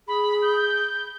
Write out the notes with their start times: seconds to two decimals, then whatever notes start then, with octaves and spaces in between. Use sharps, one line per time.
0.08 G#4 B5
0.42 G6